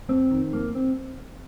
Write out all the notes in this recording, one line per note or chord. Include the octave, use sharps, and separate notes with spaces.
F2 C4
D#3
F2 A#3
C4